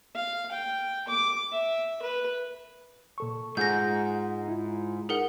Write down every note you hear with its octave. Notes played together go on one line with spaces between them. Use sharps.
F5
G5
D6
E5
B4
A#2 A4 C#6
G#2 F4 G#4 F#5 G6 A#6
E4 F4
D#4 G#4 A#4 F#5